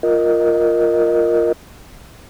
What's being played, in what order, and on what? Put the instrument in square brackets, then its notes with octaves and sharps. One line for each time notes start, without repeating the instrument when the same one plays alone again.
[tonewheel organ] F4 A#4 D#5